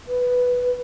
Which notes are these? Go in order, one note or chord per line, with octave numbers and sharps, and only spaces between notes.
B4